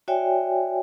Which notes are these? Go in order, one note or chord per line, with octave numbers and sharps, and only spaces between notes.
F#4 C#5 D5 E5 G5 G#5